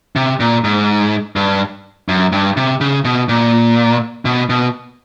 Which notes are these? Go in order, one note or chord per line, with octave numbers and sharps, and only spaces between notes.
C3
A#2
G#2
G2
F#2
G2
C3
C#3
B2
A#2
B2
B2